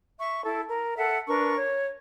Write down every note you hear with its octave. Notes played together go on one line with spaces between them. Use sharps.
E5 C#6
E4 A4
A#4
A4 E5 F#5
D4 A#4 B4 C#6
C#5